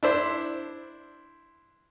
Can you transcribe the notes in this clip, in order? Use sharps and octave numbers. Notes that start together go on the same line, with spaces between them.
D4 E4 C5